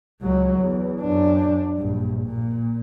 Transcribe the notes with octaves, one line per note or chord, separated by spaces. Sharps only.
C#2 F#3
E2
F#2 D4
A#1 G2
A#2